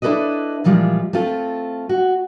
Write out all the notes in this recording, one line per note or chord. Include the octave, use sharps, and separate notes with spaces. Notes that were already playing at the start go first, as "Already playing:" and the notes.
D4 E4 A4 B4 D5 D#5
A#2 E3 F3 G3 G#3 F4
A3 C4 F4 A4
F#4